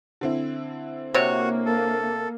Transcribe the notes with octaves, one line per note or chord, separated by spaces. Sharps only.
D3 C4 E4
C3 A#3 F#4 C#5
A4